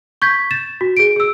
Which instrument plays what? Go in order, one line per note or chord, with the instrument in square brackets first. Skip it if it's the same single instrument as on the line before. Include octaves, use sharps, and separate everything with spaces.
[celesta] C#6 G6 G#6 B6
A6 E7
F#4
G#4 D7
G#4 E6